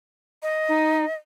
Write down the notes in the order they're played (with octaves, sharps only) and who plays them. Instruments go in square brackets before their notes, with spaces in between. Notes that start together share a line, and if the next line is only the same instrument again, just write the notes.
[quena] D#5
[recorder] D#4